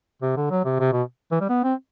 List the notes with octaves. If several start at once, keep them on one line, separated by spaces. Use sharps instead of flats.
C3
D3
F#3
C3
C3
B2
E3
G3
B3
C4